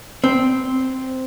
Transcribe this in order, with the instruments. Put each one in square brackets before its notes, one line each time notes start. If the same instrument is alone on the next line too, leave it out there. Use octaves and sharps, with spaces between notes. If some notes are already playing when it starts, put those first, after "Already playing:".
[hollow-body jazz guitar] C4